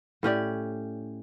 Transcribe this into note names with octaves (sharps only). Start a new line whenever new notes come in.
A2 C#4 G4 D5